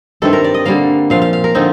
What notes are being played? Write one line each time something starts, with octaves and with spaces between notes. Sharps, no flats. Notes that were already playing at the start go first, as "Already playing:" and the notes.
G2 D#3 A3 C4 A4
A#4
D5
D#5
D3 G3 A#3 F5
A#2 F3 C4 F5
F5
F5
A#4
D3 F3 C4 D#4